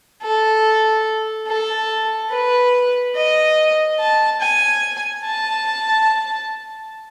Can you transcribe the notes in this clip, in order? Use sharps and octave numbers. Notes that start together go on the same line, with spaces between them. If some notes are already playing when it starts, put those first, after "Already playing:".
A4
A4
B4
D#5
A5
G#5
A5